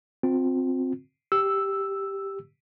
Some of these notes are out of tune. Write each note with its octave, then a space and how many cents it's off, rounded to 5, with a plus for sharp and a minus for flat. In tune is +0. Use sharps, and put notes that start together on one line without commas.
C4 +0 F4 +40
G4 +0 E6 +0